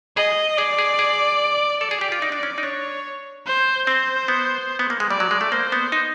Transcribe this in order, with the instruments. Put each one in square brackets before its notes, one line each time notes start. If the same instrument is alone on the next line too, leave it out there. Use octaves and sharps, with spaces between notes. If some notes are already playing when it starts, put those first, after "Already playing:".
[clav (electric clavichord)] G#4 [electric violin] D#5
[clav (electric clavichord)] G#4 [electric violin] D5
[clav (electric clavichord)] G#4
G#4
[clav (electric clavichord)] A4 [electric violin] D5
[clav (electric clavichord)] G#4
G4
F4
D#4
D4
C#4
D#4
[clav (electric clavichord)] D4 [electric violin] C#5
[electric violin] C5
[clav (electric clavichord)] C4 [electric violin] C5
[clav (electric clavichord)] B3
B3
A#3
G#3
[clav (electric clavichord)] G3 [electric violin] D5
[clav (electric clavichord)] F#3
G#3
A3
[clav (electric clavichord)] A#3 [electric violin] C5
[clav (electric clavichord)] B3
D#4